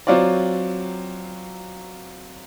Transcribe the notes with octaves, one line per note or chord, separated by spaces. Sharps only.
F#3 C4 F4 C#5 D5